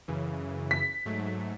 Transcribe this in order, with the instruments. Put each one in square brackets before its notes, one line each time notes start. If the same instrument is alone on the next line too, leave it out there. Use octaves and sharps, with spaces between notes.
[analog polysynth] F#2 C#3 E3
[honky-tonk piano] B6
[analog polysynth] G#2 F#3 A3